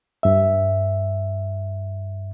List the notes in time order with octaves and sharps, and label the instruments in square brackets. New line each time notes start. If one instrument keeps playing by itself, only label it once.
[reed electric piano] G2 E5